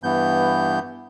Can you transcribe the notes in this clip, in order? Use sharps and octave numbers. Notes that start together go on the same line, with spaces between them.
G2 E3 B3 G6